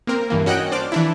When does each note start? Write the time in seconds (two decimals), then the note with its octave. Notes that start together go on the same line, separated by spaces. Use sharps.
0.07 A#3 C4 A#4
0.30 G2 E3 A#3
0.46 C#4 F#4 D#5 G5 F#6 D7
0.71 D4 C5 D5 D6 F6
0.92 E3 D4 E4